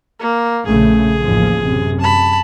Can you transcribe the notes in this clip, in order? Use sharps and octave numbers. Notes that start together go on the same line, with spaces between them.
A#3
A#1 C#3 A3 G#4
A1 D#2 F3
F#2 C3
A5 B5